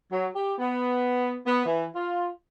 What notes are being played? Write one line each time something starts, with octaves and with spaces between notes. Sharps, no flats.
F#3
G4
B3
B3
E3
F4